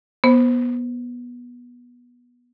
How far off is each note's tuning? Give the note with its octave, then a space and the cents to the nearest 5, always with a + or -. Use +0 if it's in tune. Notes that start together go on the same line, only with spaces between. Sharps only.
B3 -20 C5 +0